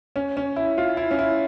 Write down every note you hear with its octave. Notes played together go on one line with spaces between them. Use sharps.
C#4
C#4
E4
F4
E4
C#4
E4